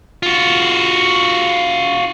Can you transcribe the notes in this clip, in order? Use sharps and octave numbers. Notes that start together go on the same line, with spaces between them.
F4 F#4